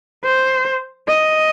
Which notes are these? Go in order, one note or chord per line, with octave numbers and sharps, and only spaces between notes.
C5
D#5